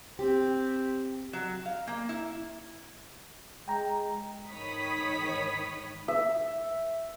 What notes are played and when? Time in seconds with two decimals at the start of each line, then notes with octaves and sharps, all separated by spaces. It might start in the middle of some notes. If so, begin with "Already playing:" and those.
0.19 C4 G4
1.33 F#3
1.66 F5
1.87 A#3
2.09 E4
3.68 G#3 G5 A#5
4.51 G#2 D#3 C#5 B5 D#6 B6
6.08 E5